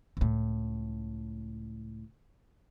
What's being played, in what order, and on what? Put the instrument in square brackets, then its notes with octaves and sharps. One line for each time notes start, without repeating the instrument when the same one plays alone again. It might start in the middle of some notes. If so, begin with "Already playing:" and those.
[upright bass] C#2 A2